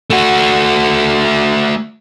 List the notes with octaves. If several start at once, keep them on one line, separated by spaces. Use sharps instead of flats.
A3 F#4